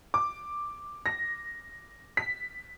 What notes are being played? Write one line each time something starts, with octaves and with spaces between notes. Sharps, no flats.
D6
A#6
B6